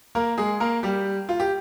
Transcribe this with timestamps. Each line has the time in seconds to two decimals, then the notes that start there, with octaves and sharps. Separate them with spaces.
0.15 A#3 A#4
0.38 G#3 G#4
0.60 A#3 A#4
0.83 G3 G4
1.29 F4
1.40 G4